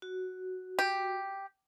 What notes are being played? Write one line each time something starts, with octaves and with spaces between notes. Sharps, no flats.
F#4
G4